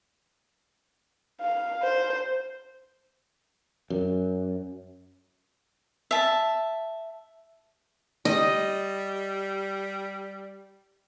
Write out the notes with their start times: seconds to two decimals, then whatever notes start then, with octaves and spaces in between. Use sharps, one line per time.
1.42 F5
1.83 C5
3.90 F#2
6.11 E5 A5
8.25 G3 D#5